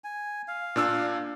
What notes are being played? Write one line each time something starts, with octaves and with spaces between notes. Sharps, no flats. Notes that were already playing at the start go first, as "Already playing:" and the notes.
G#5
F5
A#2 D4 E6